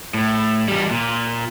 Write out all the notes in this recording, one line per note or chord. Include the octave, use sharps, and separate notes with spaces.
A2
E2 G3
A#2